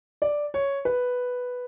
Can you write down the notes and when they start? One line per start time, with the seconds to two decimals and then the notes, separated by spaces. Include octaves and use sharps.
0.22 D5
0.54 C#5
0.85 B4